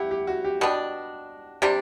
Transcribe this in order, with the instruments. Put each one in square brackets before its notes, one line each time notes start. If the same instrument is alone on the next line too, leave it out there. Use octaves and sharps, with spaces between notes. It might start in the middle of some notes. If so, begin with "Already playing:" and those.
Already playing: [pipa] E4 [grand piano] G4 F#5
[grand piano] G4
F#4
G4
[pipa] B2 G3 B3 D4 [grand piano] F#4
[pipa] C3 G3 D4 [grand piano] G4